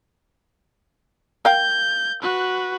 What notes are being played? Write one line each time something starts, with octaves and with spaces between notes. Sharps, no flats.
A#4 F5 G5 G6
F#4 B4